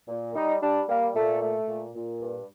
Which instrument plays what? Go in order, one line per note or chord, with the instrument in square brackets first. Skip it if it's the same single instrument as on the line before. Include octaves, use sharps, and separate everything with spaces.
[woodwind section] A#2
G3 D#4
G3 D4
G3 A#3
A#2 A3
A3
A#2
A#2
G2